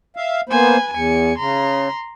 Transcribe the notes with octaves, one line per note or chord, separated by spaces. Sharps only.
E5 F5
A#3 B3 B4 C5 G#5
E2 G#5 C#7
C#3 A#5 C6